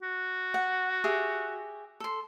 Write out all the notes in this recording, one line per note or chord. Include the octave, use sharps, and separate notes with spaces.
F#4
F#5
G4 G#4 E5
A4 C6